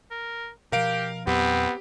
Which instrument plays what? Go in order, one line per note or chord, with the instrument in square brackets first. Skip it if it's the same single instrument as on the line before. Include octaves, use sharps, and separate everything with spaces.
[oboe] A#4
[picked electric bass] B2 F3 [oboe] G4 [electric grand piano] A#4 F5 D7
[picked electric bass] E2 A#2 F#3 [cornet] B3 [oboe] C4 [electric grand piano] G4